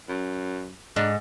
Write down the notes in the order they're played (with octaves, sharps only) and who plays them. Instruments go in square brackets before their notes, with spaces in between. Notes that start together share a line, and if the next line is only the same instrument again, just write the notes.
[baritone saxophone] F#2
[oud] G#2 [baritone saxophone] D4